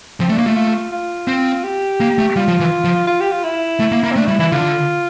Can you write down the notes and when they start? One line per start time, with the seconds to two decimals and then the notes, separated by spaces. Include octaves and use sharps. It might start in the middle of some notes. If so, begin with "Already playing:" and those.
0.20 F3 C4
0.29 A3
0.32 D4
0.38 A#3
0.45 A3 F4
0.56 F4
0.92 F4
1.28 C4
1.63 G4
2.00 A#3
2.18 A3
2.36 G3 F4
2.48 F3
2.60 E3
2.84 F3
3.07 F4
3.20 G4
3.31 F4
3.44 E4
3.79 A3
3.92 A#3
4.04 A#3
4.12 C4
4.16 A3 D4
4.28 G3 E4
4.39 E3 E4
4.52 D3 F4